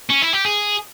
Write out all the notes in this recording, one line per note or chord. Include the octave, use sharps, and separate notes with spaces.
C#4
E4
G4
G#4